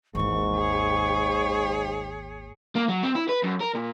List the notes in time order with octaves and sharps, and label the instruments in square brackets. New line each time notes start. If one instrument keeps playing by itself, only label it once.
[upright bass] G#1 D#2 [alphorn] G#2 [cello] E3 [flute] C#6
[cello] G#4 C#5
[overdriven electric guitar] A#3
F#3
C4
E4
B4
F#2
A#4
A#2